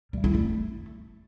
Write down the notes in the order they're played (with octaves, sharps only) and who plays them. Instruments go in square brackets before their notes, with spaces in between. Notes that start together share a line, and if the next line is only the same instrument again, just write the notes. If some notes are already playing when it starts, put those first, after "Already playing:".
[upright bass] G3
E4
A3